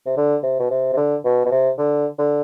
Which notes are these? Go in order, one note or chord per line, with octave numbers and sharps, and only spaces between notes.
C3
D3
C3
B2
C3
C3
D3
B2
B2
C3
D3
D3